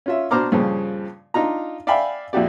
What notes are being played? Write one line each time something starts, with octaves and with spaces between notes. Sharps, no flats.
C#4 F4 E5
B2 D4 C5 A#5 D6 F6
G2 A#2 C#3 F3
D4 D#4 F4 A#5
D5 E5 F5 G5 G#5 B5
F2 A#2 E4 F#4 G4 D5